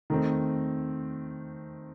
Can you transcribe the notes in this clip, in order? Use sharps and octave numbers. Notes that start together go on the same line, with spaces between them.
D#3 A3 C4